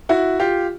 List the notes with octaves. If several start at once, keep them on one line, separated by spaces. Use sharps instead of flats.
E4 F#4
F4 G4